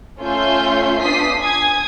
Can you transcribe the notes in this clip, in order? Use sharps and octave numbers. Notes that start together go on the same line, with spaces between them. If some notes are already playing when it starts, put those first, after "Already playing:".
A3 C#4 F4 E5 C6 G6
B3 D4 F4 D#6 B6 C7
G#5 D#6 G#6